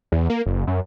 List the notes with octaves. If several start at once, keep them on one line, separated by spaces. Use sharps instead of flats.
E2
A#3
F#1
F#2